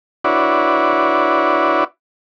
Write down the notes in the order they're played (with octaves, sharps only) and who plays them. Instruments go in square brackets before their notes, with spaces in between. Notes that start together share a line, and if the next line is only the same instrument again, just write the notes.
[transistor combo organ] D4 E4 F#4 B4 C#5 D5